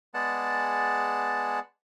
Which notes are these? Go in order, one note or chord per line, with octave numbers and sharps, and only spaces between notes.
G#3 B3 G#4 D5 F#5 A5